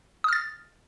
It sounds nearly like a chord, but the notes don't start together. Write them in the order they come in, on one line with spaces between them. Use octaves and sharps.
D#6 F6 A6